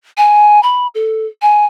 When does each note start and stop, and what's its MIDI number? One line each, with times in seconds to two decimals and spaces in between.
0.17 0.62 80
0.63 0.87 83
0.95 1.26 69
1.42 1.65 80